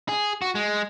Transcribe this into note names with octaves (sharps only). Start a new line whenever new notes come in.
G#4
F#4
G#3